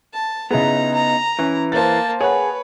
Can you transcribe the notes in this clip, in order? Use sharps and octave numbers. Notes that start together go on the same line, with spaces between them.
A5
C#3 B3 D#4 E4 G#4 A#5
A#5
E3 C#4
A#3 C5 A5 A6
G#4 B4 C#5 F#5